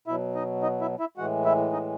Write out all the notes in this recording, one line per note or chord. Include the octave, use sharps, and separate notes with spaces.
B2 F#3 E4 E5
D#4 D#5
D#4 D#5
E4 E5
E4 E5
A2 E3 G#3 F#4 F#5
E4 E5
D#4 D#5